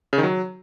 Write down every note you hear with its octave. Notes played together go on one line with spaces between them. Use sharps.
C#3
D#3
F#3